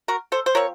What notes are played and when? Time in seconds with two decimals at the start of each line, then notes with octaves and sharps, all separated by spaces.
0.08 F#4 A#4
0.32 A4 C5
0.46 C5
0.55 F3 C4 A#4 C#5